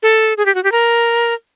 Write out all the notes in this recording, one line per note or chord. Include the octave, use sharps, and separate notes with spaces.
A4
G#4
G4
F#4
G4
A#4